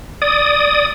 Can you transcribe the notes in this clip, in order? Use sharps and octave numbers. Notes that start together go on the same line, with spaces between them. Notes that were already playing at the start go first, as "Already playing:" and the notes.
D5 D#6